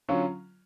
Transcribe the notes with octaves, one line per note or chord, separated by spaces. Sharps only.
D3 F#3 C#4 F4